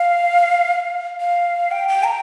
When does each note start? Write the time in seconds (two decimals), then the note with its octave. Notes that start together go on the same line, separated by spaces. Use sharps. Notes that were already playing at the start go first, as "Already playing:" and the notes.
Already playing: F5
1.20 F5
1.71 G5
1.88 G5
2.05 A#5